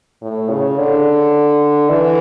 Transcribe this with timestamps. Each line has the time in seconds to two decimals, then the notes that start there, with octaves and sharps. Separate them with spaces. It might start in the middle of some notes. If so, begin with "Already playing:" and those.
0.22 A2
0.49 C#3
0.78 D3
1.90 E3